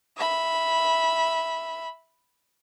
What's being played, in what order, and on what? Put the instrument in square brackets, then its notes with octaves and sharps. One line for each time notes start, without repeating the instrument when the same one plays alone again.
[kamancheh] E5 B5